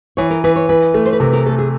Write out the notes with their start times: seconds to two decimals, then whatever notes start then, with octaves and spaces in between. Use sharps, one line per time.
0.17 E3 C#5
0.30 A#4
0.44 E3 B4
0.56 C#5
0.69 E3 B4
0.94 A3
1.06 C5
1.13 B4
1.20 C3 A#4
1.33 A#4
1.46 A3 A4
1.58 G#4